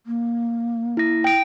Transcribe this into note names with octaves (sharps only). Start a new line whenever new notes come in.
A#3
E4 A#6
G5 D7